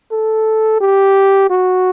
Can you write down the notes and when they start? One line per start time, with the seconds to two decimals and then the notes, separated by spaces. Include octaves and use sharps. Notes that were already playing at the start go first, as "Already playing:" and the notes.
0.11 A4
0.81 G4
1.50 F#4